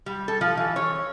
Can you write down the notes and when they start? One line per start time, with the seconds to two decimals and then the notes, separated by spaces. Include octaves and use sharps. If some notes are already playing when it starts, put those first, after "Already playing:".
0.06 G3
0.28 A4
0.41 F3
0.57 E3
0.76 C#5